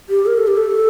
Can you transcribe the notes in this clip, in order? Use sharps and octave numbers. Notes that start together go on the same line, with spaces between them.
G4
A#4
A4
G4
A4